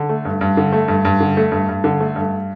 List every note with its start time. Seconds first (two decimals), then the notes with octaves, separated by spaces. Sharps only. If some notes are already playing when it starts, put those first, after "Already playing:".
Already playing: D3
0.09 A3
0.25 G2
0.41 G2
0.57 D3
0.72 A3
0.88 G2
1.05 G2
1.21 D3
1.37 A3
1.52 G2
1.69 G2
1.84 D3
2.00 A3
2.16 G2